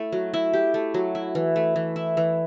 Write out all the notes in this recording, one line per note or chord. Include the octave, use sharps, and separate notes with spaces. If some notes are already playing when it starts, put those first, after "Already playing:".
Already playing: A3 E4
F#3
E4
G4
A3
F#3
E4
E3
A3
E3
E4
E3